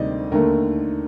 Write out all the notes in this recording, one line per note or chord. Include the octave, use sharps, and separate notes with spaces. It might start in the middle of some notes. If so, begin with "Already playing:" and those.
Already playing: D2 C3 D#3 G3 D5 D#5
D#2 D3 A3 A#4